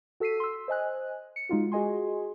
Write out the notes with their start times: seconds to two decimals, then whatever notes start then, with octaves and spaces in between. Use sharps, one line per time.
0.20 F#4 A4 E6 B6 C7 D#7
0.40 C6 E6
0.68 C5 D#5 G#5 F#6
1.36 C#7
1.49 G#3 D#4 F4 F#4
1.72 F#4 G#4 D#5 G#5 C6